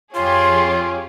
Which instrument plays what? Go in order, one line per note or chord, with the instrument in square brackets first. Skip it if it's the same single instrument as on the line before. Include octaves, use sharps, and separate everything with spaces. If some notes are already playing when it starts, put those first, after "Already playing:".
[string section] F2 G4 G#4 [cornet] F4 [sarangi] C#5 [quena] C6